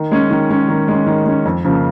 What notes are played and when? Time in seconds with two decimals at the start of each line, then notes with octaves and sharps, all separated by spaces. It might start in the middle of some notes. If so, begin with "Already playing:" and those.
Already playing: D#3
0.11 G#3 C#4
0.31 D#3
0.50 G#3 C#4
0.69 D#3
0.88 G#3 C#4
1.07 D#3
1.26 G#3 C#4
1.45 F2
1.65 C#3 F3 A#3